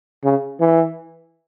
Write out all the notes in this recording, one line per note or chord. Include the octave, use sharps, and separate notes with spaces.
C#3
E3